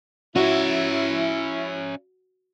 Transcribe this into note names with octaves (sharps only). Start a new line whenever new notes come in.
C#4 E4 F#4 E5